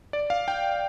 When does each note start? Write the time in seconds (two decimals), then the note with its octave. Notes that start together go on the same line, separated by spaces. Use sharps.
0.13 D5
0.30 F5
0.48 G5